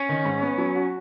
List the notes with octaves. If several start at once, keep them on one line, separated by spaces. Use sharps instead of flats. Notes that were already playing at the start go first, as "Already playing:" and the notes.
Already playing: C#4
D#3
G#2
B3
F#3
F#4